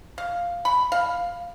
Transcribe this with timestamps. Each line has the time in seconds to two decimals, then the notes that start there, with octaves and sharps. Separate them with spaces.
0.18 F5
0.65 B5
0.92 F5